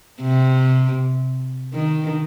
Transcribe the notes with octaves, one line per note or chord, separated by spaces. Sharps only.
C3
D#3